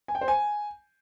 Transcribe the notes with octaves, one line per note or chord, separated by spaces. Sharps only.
G#5
G5
C5
G#5